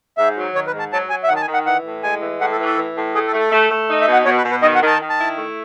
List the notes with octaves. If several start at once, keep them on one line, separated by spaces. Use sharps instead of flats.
G#2 E5
F#3
D#3 C#5
B4
G#2
A5
F#3 A5
F#3 G#5
E5
D#3 F#5
A5
G#5
D#3
F#5
E3 F#5
A2
G#3 G#5
E3
A2 F#5
A4
E3
A4
E3
A2
A3 G#4
A4
A3
A4
A3
A3
D#4
E5
B2
F#5
B2 C#5
B4
B2
B4
D#3 D#5
F#5
D#3
A5
D#3
A5
E4
A3